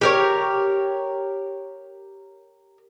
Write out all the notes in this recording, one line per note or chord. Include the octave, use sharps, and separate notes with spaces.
G4 A#4 C#5